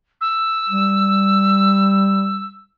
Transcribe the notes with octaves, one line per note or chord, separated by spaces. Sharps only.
E6
G3